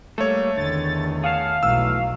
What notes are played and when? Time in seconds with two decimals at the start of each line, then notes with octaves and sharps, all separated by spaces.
0.18 G3 A3 A#3 A4 C#5
0.57 E2 D3 D#3 A6
1.24 G#4 F5 F#5 A5
1.63 B1 E3 F#3 A3 E6